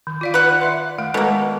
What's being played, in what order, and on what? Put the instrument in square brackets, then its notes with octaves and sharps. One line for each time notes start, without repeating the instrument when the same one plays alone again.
[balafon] D#3
F4 D5 F5
[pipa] B4 F#5
[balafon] D5 E5 C6
D#3 A3 F5
[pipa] B2 A#3 [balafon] G#3 A4